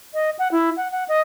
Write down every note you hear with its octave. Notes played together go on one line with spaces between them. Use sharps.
D#5
F#5
E4
F#5
F#5
D#5